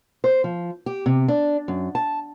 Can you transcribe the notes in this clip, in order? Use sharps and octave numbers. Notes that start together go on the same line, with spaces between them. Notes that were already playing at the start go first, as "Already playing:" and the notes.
C5
F3
G4
C3
D4
F#2
A5